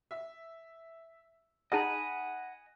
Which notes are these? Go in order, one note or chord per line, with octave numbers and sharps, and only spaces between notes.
E5
D#4 G#4 D#5 F#5 G#5 A5 B5